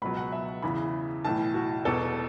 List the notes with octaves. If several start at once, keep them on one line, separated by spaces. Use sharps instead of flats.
C#2 B2 F#3 B5
F#5
E5
E2 C#3 E3 B5
B1 A2 E3 A5
F#4
E1 E2 B2 A4